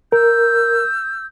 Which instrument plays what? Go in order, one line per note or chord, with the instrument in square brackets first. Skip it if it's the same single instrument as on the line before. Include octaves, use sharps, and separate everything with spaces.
[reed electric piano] A#4 [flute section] E6 G6